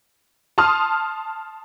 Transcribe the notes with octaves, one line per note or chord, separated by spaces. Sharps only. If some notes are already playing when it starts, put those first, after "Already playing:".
A5 C6 D#6 F6